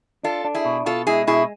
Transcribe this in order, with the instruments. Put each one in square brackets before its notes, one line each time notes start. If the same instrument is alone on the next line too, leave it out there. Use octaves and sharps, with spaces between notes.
[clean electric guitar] D4 [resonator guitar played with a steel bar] F4 A4
[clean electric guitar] D4
[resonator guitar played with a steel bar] E4 G#4
[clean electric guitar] B2
[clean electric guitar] B2 [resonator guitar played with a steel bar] F4 A4
[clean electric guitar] G#3 [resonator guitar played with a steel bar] E4 G#4
[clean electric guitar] B2 [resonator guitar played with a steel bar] E4 G#4